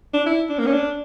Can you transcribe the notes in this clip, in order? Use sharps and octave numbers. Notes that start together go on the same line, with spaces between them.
D4
E4
D4
A#3
C#4
D4